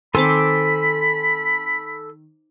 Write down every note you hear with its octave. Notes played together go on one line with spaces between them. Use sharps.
D#3 C4 A4 G#5 B5 C6 D6